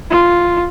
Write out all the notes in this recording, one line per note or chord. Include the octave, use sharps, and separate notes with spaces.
F4